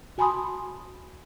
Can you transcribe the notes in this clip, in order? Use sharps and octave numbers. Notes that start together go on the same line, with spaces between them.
F#4 G#5 A5 B5 C6 D#6